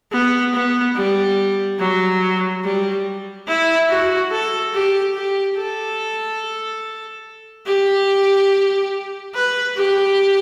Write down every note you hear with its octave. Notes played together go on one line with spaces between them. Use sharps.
B3
B3
G3
F#3
G3
E4
F#4
A4
G4
G4
A4
G4
B4
G4